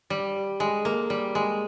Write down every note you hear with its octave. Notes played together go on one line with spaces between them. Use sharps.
G3
G#3
A#3
G3
G#3